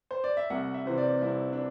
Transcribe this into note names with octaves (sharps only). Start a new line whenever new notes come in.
C5
D5
E5
C2 F#5
E5
C3 E3 C5
D5
C2 E4
D4